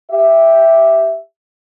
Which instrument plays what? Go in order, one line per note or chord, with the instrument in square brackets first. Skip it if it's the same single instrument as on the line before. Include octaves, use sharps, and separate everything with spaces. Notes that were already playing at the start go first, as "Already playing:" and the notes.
[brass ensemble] G4 E5